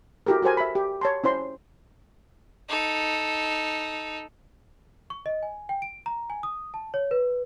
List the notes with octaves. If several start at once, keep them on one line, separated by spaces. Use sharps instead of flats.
E4 F#4 G4 A4 A#4
F#4 A4 A#4 C5 G#5
E5 B5
G4
C#5 A5 C6
C#4 E4 C5 C6
D#4 A4
C#6
D#5
G#5
G5
D7
A#5
G#5
D#6
A5
C#5
B4